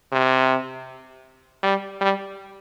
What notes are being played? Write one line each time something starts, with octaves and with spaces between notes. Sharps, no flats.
C3
G3
G3